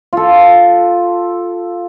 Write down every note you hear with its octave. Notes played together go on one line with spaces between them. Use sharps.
F4 A4